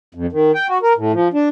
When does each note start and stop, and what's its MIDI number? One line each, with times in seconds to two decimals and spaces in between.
0.15 0.26 41
0.32 0.52 51
0.54 0.67 79
0.69 0.78 66
0.83 0.93 70
0.97 1.12 45
1.13 1.28 53
1.34 1.49 62